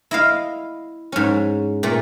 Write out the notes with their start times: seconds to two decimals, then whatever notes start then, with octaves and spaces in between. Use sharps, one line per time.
0.11 E4 D#5 F5
1.12 G#2 C#4
1.83 A#2 A3